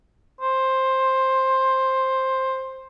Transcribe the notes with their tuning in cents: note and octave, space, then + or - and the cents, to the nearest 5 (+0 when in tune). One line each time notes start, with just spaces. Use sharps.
C5 +10